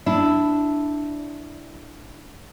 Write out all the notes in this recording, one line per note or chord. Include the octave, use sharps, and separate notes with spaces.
D4 E4